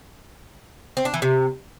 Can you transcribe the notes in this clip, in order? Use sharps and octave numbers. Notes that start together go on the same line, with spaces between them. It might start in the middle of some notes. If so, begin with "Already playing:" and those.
C4
D4
E3
C3